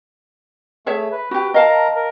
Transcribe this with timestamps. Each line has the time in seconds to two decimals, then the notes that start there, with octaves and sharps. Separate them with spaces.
0.86 A3 G#4 C#5 E5
1.12 B4
1.31 F#4 G4 B4
1.54 A#4 D#5 F5 A5 A#5
1.95 A#4